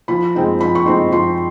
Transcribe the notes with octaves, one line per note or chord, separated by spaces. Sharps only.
F3 B5
G#3 C4 D#4
F3 B5
C#6
G#3 C4 D#4 C6
F3 C6